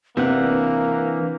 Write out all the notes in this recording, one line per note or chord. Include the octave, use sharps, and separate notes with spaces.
C3 E3 A#3 D4 B4 F#5